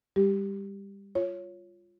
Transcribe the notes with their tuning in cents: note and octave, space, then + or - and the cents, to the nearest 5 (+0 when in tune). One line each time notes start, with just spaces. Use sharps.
G3 +30 G4 +0
F4 +0 C#5 -5